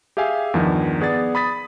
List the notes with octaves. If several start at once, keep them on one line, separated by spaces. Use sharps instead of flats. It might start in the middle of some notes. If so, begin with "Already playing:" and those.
G4 G#4 E5 F5 G#5
E2 G2 D#3 F3
B3 G#4 D5 A6
B5 D#6 A6 B6